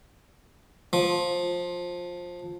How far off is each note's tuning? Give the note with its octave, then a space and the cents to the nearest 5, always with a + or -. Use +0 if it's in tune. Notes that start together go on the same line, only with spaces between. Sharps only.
F3 +15